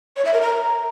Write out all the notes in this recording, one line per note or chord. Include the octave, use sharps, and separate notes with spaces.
C#5
E5
A#4
A#5